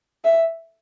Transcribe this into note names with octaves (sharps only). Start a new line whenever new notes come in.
E5